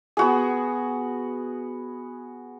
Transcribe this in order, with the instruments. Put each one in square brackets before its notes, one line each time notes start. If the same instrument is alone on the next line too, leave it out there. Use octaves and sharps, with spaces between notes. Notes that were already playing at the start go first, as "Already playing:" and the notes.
[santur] B3 F#4 G#4